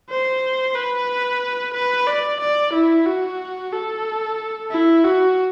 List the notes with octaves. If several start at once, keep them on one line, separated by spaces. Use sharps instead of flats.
C5
B4
B4
D5
D5
E4
F#4
A4
E4
F#4